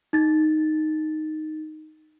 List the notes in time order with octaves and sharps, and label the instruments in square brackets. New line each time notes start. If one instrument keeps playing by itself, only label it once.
[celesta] D#4 A6